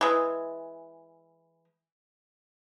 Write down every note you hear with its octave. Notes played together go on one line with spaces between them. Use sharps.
E3 G#3